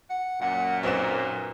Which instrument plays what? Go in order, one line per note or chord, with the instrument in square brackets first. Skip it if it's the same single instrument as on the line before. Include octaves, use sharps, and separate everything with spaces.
[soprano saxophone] F#5
[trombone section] F#2 A#2 [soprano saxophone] F#5
[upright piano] B1 B3 E7 [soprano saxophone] C4